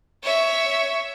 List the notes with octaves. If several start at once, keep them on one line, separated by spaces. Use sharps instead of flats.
C#5 E5